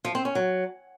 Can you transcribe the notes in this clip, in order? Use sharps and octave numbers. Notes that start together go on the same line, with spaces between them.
F3
C4
C#4
F#3